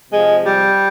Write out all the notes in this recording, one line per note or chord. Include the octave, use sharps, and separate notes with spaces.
C3 F3 G#3
G3